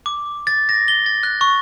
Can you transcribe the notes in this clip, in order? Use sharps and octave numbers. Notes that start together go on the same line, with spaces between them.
D6
A6
A#6
G7
A6
F#6
C#6